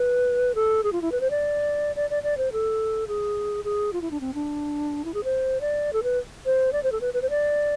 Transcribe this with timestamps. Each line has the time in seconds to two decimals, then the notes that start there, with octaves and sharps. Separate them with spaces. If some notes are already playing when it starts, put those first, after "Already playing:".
Already playing: B4
0.55 A4
0.84 G#4
0.93 F4
1.02 E4
1.12 B4
1.21 C5
1.31 D5
1.96 D5
2.10 D5
2.23 D5
2.38 C5
2.52 A4
3.08 G#4
3.64 G#4
3.93 F4
4.02 E4
4.11 D4
4.21 C4
4.34 D4
5.05 E4
5.14 G#4
5.24 C5
5.61 D5
5.93 A4
6.03 B4
6.46 C5
6.73 D5
6.83 C5
6.92 A4
7.01 B4
7.14 B4
7.22 C5
7.30 D5